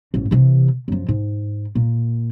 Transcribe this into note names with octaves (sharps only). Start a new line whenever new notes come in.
A1 G#2
C3 E3
F#2 F3
G#2
A#2